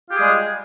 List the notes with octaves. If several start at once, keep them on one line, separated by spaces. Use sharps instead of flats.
G3 G#3 F4 G4 G#4